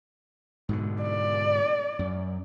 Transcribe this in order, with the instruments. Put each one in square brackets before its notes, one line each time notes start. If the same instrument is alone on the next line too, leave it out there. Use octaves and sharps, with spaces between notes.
[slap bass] G#2 B2 D3
[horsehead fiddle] D5
[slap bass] F#2